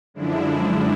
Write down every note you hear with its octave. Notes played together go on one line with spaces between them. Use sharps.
F#2 D3 F3 G#3 D4 E4
D4 E4